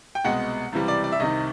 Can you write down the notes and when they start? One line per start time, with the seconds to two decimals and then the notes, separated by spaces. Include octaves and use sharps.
0.15 G5
0.24 C2 B2 G#3 F#5
0.72 C#2 C3 E3 G3
0.88 D5
1.04 D5
1.12 E5
1.20 C2 C3 D#3 D#5